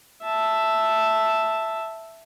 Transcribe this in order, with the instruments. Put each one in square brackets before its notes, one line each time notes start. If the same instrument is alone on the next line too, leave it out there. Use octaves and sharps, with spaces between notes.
[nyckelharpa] E5 A5